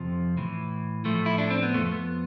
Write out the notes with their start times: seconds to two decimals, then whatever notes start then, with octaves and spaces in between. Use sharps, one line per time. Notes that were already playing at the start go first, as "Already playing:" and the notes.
Already playing: F2 C3 F3
0.37 A2 E3
1.05 A2 F3 A3
1.26 E4
1.38 D4
1.50 C4
1.63 B3
1.74 F2 D3 F3 A3
1.91 B3